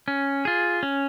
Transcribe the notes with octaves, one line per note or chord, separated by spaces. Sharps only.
C#4
F4 G#4
C#4